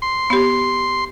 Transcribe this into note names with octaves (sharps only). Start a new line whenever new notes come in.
C6
B3 G4